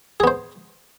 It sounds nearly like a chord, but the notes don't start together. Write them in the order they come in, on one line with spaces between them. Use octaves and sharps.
G#4 B3 C5